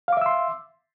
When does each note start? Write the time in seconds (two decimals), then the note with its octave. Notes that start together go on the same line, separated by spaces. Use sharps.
0.08 F5
0.13 D6
0.17 E5
0.22 E6
0.26 C6